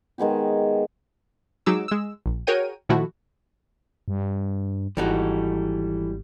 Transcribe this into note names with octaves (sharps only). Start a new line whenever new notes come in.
D#3 G#3 B3 G4
F#3 G#3 D#4 D6 E6
G#3 E6
A#1
F#4 G#4 A#4 C#5 G5 D#7
A#2 D#3 F3 A3 E4 F#4
G2
G#1 E3 G3 D#4 F#4 A4